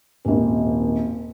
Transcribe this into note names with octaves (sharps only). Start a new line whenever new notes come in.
D#1 G#1